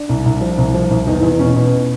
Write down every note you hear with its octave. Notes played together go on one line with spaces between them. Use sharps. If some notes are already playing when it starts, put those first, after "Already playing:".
Already playing: D4
C2
C2
F3
C2
F3
C2
E2 D#4
E2
B2 C#4
B2